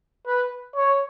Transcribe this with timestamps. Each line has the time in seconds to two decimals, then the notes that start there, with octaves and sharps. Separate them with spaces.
0.27 B4
0.76 C#5